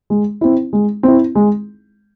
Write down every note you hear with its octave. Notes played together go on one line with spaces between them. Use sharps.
G#3
C4 E4
G#3
C4 E4
G#3